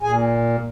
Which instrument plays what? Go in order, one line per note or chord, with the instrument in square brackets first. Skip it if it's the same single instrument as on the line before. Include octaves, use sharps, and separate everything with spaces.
[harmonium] A#2 G#4 G#5